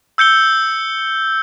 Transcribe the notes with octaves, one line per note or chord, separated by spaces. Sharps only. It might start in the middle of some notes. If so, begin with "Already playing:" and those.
E6 G6 C#7 G7